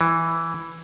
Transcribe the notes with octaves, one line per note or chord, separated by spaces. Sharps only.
E3